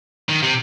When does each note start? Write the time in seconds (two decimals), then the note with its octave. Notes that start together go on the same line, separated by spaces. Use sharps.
0.29 D#3
0.43 C3